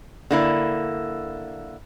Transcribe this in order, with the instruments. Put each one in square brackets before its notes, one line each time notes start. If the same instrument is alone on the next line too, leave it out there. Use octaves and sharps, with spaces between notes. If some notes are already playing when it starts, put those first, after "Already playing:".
[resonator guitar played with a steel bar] D3 A#3 E4